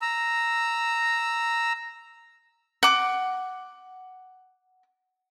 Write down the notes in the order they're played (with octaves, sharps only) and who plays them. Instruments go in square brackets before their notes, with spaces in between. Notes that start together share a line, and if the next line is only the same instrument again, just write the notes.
[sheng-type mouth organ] A#5 E6
[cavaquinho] F#5 D6